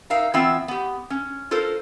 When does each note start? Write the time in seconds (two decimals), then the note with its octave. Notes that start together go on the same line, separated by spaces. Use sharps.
0.10 D#4 A#4 E5 F5
0.34 E3 B3 C4 F4 E5
0.68 B3 G4
1.10 C#4
1.51 F4 A4 A#4 C5